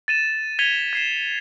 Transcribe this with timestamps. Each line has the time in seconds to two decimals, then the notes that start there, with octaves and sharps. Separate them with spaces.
0.08 A6 D#7 E7
0.59 G#6 B6 C#7 D#7 F7 G7
0.93 G#6 C7 E7